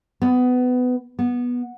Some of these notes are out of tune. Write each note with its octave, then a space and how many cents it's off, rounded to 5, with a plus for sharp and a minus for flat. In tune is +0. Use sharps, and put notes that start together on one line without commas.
B3 +20
B3 -15